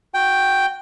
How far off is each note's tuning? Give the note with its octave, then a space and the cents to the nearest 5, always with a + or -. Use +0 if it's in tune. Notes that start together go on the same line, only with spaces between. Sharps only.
F#4 -15 G5 +0